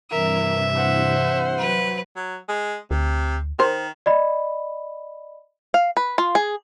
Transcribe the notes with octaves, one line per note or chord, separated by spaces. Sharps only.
G2 C3 E3 A#4 E5
C5 F#5
F#3 B4
F#3
G#3
D2 C3
D#3 A#4 C5
D5 D#5 B5
F5
B4
F4
G#4